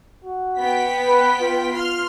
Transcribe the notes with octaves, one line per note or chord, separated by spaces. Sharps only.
F#4
B3 G5 B6
B4
F4
F4 C6 F6